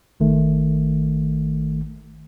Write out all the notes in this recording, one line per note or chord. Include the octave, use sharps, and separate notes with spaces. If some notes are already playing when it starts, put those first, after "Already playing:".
G#1 D#3 A3